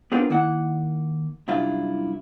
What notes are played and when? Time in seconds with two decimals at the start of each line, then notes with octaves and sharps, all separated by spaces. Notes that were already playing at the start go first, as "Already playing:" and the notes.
0.12 B3 C4 D4 F4 G#4 A#4
0.30 D#3 A#3 E4 F#5
1.48 C2 F#2 D4 E4 F4 F5